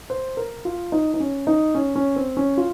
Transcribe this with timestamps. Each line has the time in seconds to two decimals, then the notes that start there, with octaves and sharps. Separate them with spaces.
0.10 C5
0.37 A#4
0.65 F4
0.92 D#4
1.14 D#4
1.20 C#4
1.47 D#4
1.75 C#4
1.96 C#4
2.16 C4
2.37 C#4
2.57 F4